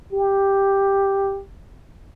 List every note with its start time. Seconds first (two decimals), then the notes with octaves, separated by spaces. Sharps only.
0.13 G4